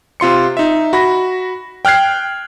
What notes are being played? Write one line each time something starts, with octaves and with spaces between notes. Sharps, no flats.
C3 F4 C6 C#7
D#4 E5
F#4 B5 A#6
G5 F6 F#6 G#6 C7